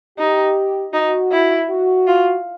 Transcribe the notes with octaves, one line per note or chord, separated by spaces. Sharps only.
D#4 G4
D#4 F#4
E4
F#4
F4